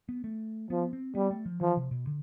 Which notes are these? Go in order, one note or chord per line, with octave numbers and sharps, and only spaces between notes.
B3
A3
F3 B3
C4
G3 B3
A3
F3
E3 F3
C3
B2
D3